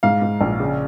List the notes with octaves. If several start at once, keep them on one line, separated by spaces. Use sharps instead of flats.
G#2 F5
G#2
A#1
C#3